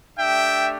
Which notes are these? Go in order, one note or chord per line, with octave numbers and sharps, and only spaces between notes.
A3 D4 G4 E5 G5